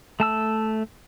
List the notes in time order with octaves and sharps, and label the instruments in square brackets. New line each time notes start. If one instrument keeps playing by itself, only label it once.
[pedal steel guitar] A3 A5 E6